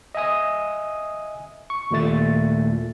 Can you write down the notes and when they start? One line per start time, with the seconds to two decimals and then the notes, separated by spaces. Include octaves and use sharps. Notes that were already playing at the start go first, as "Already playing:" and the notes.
0.15 D#5 E5 G#5 D#6
1.70 C#6
1.91 D#2 A#2 A3 A6